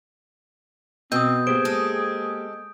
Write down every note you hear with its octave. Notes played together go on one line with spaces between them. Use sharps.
B2 C4 D#5 D#6 G6
A#3 G4 G#4 C5 D7
G#3 A4